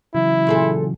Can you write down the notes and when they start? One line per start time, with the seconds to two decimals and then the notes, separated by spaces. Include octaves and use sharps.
0.15 C#3 E3 F#3 E4
0.47 A#2 G#4 A4